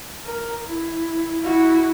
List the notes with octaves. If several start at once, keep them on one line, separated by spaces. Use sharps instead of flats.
A#4
E4
E4 F#4